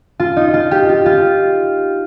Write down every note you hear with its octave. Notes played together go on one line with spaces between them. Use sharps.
F4
D#4
F4
G4
F4
F4